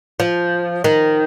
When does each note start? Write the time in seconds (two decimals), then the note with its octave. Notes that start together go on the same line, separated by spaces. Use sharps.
0.20 F3
0.84 D#3